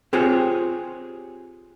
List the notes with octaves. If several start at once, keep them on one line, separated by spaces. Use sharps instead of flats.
C4 F4 G4 G#4 C5 C#5